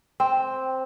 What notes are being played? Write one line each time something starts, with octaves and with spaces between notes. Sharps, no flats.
C4